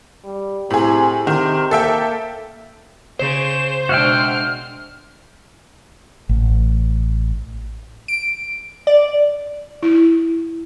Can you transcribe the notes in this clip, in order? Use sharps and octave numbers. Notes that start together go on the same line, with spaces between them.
G3
A2 C3 G#4
C3 D#3
A#3 A4 E5 G5
C#3 G#4 C5 E7
B2 G#3 D4 F#4 E5 G5 F6
A1
D7
D5
E4